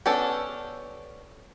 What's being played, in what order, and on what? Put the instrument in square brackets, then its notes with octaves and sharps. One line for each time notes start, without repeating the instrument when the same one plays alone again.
[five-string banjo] B3 C#4 D4 G4 A4